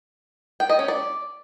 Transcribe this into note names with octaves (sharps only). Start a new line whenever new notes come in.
G5
D#5
C#4
D5